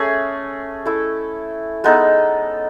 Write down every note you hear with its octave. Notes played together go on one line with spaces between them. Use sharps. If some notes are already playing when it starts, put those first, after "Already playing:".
Already playing: A3 C#4 G#4
A3 E4 A4
G#3 B3 D#4 A4